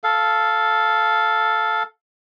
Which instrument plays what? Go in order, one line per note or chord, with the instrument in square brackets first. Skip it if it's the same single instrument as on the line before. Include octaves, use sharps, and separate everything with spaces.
[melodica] A4 F5